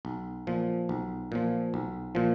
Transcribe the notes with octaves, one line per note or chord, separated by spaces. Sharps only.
B1
A#2 F3
B1
A#2 F3
B1
A#2 F3